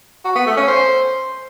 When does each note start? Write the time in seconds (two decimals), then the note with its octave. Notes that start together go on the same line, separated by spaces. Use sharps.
0.25 F#4
0.36 B3
0.46 A3
0.57 C#4
0.68 C5